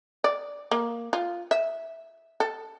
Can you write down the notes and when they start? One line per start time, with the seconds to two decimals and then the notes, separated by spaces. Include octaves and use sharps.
0.24 D5
0.71 A#3
1.13 F4
1.51 E5
2.40 A4